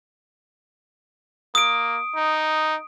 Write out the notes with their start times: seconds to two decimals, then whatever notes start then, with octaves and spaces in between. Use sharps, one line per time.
1.55 A#3 D#6 D7
2.16 D#4